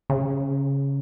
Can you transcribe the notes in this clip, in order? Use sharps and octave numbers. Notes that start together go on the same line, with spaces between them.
C#3